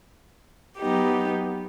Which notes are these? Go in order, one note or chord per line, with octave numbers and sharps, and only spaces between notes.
F#3 B3 D#4 G4